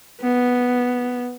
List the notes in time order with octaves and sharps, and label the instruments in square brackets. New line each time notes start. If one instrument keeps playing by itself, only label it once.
[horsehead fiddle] B3